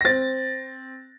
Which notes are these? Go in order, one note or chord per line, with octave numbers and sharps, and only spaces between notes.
A#6
C4 A6